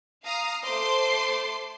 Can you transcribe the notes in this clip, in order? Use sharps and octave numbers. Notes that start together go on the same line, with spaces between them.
F5 A#5 D#6
A3 C5 C6 D6